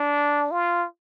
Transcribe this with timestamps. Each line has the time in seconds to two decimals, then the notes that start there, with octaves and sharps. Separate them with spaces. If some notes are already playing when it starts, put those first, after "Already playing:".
Already playing: D4
0.52 F4